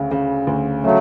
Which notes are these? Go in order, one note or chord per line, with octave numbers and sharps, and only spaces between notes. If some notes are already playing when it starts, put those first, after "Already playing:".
Already playing: D2 C#3
C#3
D2
C#3 F#3 A3